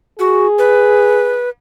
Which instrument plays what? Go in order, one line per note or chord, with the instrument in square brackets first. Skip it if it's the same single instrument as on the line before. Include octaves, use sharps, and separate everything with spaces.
[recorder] F#4 [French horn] G#4
[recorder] B4